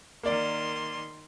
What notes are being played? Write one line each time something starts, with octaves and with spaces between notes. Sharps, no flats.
D#3 A#3 D5 C6